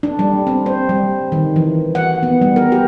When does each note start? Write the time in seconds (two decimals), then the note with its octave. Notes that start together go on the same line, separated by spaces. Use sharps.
0.03 D4
0.19 G3
0.47 C4
0.66 C5
0.89 G3
1.32 D#3
1.56 E3
1.95 F#5
2.23 B3
2.42 G3
2.56 A#4
2.72 G4